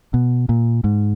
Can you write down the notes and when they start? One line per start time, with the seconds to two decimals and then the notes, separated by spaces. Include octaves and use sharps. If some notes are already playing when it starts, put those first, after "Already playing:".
0.14 B2
0.49 A#2
0.84 G#2